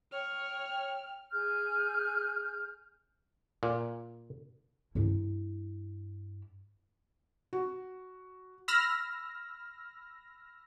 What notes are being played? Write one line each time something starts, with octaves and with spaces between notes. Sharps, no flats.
C#5 G5 F6
G#4 F6 G6
A#2
G2 E4
F#4
B5 E6 F6 A#6